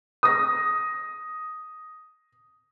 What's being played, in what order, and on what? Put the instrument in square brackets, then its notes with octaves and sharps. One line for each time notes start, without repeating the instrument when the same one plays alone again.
[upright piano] D#6 A#6